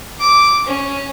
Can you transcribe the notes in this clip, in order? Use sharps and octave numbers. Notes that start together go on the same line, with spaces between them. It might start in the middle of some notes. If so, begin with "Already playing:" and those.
D6
C#4